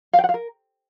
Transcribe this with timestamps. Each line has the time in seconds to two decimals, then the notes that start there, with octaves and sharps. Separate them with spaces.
0.13 F5
0.19 G5
0.24 F#5
0.29 F5
0.34 A#4